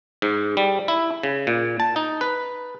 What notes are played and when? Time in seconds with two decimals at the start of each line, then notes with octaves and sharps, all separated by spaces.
0.22 G#2
0.57 G3
0.88 E4
1.23 C#3
1.47 A#2
1.80 A5
1.96 D#4
2.21 B4